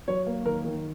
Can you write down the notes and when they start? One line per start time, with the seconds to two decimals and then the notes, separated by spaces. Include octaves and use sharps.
0.08 F#3 C#5
0.27 A#3
0.46 D#3 A#4
0.65 D#3